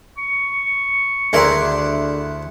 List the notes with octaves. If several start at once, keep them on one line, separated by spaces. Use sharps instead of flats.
C#6
D2 D4 E4 G#4 A#4 C6